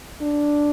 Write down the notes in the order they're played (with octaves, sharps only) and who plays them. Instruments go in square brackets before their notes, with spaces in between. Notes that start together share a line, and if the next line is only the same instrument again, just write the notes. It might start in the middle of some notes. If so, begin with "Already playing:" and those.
[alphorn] D4